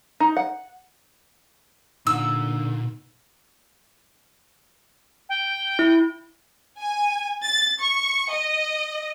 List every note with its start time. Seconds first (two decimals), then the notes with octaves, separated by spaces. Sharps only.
0.20 D#4
0.37 F#5
2.07 A#2 D3 D#4 F#5 E6
5.29 G5
5.79 E4
6.79 G#5
7.45 A6
7.81 C#6
8.32 D#5